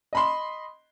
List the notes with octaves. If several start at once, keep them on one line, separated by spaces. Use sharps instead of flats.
D#5 B5 C6